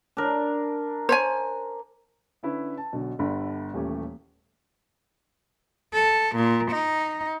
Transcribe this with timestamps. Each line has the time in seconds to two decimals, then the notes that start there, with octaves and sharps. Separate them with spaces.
0.17 D4 A#4
1.09 C5 C#5 G#5
2.43 D3 C#4 E4 B4
2.77 A5
2.93 B1 B2 D3
3.19 G1 G2 D3 B5
3.74 D#1 E3 A3 C#4 G4
5.94 A4
6.36 A#2
6.72 D#4